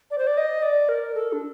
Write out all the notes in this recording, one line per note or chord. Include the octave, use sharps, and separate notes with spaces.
D5
C5
D5
D#5
D5
A#4
A4
D4